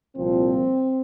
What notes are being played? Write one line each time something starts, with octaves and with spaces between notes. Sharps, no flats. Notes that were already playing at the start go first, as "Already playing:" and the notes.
C2 A#2 F3 C4